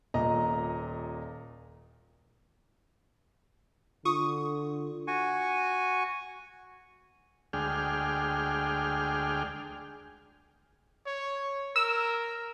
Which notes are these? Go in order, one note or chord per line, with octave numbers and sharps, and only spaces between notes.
D#1 A#2 D#5 A#5
D3 F4 C#6 D#6
F#4 G#5 C#6
D2 G#3 D4 G#4 G5 F6
C#5
A#4 E6